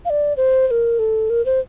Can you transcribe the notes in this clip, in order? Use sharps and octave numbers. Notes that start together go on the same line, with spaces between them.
F5
D5
C5
C5
A#4
A4
A#4
C5